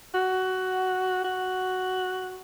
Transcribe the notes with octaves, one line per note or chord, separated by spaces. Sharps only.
F#4
F#4